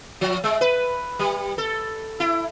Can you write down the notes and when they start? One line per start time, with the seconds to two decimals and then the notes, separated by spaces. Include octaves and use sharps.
0.21 F3
0.44 G#3
0.61 B4
1.19 G3
1.58 A4
2.20 E4